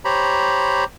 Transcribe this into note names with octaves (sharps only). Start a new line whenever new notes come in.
G4 C5 C#5 A#5 B5